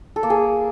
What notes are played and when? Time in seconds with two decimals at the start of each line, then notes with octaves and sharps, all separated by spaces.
0.16 A4
0.23 A#3
0.30 G#4